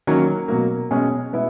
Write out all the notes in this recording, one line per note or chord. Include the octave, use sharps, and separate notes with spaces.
D#3 F#3 A#3 C#4
B2 F#3 A#3
B2 G#3 C#4 G#4
B2 G#3 B3 E4